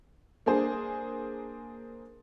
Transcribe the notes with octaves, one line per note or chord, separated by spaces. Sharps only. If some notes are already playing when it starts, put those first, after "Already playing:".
A#3 D4 G#4 C5